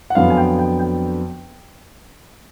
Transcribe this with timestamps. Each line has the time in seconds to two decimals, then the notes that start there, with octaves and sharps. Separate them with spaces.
0.10 F#5
0.15 F2 D3 F#3 B3 F5
0.30 G#5
0.37 G5
0.59 G5
0.79 G5